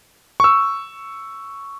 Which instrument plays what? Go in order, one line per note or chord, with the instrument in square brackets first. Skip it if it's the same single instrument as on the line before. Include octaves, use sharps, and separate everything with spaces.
[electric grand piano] C#6 E6